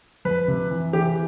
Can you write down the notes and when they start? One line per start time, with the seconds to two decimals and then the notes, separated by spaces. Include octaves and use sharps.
0.25 F2 B4
0.48 C3
0.70 E3
0.93 E3 G4